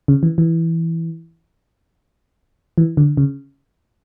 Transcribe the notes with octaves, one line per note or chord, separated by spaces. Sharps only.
C#3
E3
E3
E3
D3
C#3